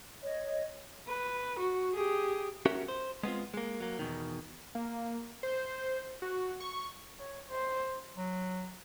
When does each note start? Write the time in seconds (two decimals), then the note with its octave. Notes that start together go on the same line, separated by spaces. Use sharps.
0.22 C#5 D#5
1.08 B4
1.60 F#4
1.94 G4 G#4
2.66 C#4 F#4 G4 A#4 E5
2.88 C5
3.23 G#3 B3 C4 F4
3.54 G#3 A#3
3.80 F#3 A#3
3.99 E2 B2 D#3
4.75 A#3
5.43 C5
6.22 F#4
6.60 C#6
7.20 C#5
7.50 C5
8.16 F#3